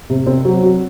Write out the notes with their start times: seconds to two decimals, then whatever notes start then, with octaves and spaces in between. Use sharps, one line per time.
0.10 C3
0.26 C4
0.45 F#3
0.63 F#4